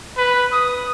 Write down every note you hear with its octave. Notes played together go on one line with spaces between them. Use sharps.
B4
D#6